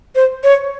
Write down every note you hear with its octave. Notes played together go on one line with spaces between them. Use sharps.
C5
C#5